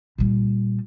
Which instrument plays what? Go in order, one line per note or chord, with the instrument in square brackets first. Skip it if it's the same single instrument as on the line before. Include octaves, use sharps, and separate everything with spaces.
[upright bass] A#2 G3